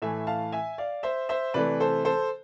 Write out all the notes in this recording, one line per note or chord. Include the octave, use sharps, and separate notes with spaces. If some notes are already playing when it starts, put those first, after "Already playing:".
A2 E3 A3 E5 G#5
F5 A5
E5 G#5
D5 F5
C5 E5
C5 E5
C3 E3 A3 B4 D5
A4 C5
A4 C5